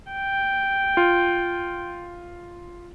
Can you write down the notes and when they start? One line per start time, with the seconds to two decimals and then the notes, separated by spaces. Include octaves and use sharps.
0.12 G5
0.97 F4